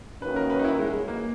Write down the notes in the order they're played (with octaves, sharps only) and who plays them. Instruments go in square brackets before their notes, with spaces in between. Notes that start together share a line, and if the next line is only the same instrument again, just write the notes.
[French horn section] F#2 D#3 F#3 A#3 C#4 [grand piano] B4
[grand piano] A#4
B4
D#4
E4
G#3
G#3
A#3